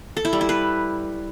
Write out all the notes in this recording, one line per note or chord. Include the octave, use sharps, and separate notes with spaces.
A4
E4
G3
E4
B4